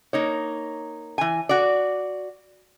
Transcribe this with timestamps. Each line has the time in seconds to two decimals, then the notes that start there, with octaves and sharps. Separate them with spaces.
0.13 A#3 D#4 C#5
1.18 E3 G#5
1.49 F#4 D5